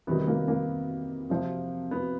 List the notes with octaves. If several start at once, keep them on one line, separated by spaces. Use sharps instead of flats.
C3 D#3 G3 B3
A#3
A#3
C3 F3
B3